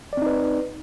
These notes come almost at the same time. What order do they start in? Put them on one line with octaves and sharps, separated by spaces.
D5 C4 D#4 B4